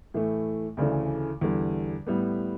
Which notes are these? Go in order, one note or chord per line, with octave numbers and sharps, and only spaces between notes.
A2 E3 A3
D2 C#3 E3 A3 D5
E2 D3 G3
A2 G3 B3